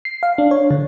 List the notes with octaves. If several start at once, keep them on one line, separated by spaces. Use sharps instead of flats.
C7
F5
D4
C#5
D3